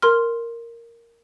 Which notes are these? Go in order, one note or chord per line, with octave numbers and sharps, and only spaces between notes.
A#4 C6 F6